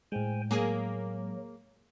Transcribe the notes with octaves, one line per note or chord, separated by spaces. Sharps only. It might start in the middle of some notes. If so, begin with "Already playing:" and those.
A2 G#3 C5 G5 G#5
F#3 A#3 G#4